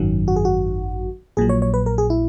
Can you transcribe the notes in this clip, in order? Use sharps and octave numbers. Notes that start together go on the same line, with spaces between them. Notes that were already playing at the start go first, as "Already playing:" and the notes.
Already playing: G#1 F#2 D#3 F#3
F#4
G#4
F#4
A#1 A#2 F#3 G#4
C#5
C#5
B4
A#4
G#4
E4